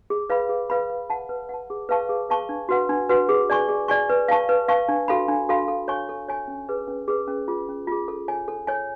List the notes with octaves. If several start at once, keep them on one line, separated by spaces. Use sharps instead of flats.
G#4
B4 F5 B5
G#4
B4 F5 B5
B4
F#5 A5
B4
F#5 A5
G#4
B4 F5 A5 C#6
G#4
B4 F5 A5 C#6
D4
F#4 B4 F#5
D4
F#4 B4 F#5
G#4
D5 G#5 C#6
G#4
D5 G#5 C#6
B4
F5 A5 C#6
B4
F5 A5 C#6
D4
F#4 A4 F5 B5
D4
F#4 A4 F5 B5
A4
C#5 G#5 C#6
A4
C#5 G#5 C#6
C#4
G#4 B4
C#4
G#4 B4
C#4
F4 G#4
C#4
F4 G#4
A4
C#5 G#5
A4
C#5 G#5